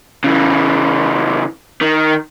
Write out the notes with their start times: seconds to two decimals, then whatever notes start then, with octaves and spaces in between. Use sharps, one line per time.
0.24 C#3 E3
1.82 D#3